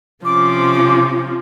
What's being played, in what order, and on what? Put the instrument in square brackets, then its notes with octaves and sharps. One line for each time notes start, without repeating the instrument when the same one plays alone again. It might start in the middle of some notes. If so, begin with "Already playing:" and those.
[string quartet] C3 F3 C#4 [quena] D6